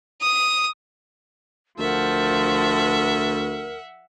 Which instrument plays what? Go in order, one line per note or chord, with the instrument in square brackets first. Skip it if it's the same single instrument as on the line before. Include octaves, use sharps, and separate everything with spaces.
[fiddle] D#6
[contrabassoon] D2 [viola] F3 A5 [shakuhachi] A#4 [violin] E5 F#5